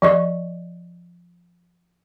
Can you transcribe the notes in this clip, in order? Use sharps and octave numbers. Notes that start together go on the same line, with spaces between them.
F3 D#5 C#6